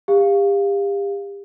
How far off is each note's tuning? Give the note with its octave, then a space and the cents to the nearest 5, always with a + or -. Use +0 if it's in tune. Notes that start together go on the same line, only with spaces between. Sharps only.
G4 +35 F5 +0